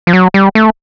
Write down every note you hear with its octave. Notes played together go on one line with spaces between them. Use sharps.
F3
F#3
G3
A3